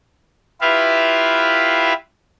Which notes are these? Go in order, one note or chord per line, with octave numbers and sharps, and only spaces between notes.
E4 F4 G4 B4 E5 F5